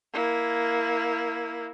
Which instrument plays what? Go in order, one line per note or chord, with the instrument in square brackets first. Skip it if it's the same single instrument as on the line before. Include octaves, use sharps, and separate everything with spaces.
[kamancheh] A#3 E4